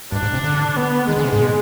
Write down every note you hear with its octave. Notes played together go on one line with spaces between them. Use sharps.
G2 D4
G#2
C3
D3
B3
D#3 G#3
D3
C3
G#2
B2